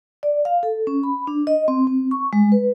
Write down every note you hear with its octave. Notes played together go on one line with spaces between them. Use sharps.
D5
F5
A4
C#4
B5
D4
D#5
C4
C4
C#6
G#3
B4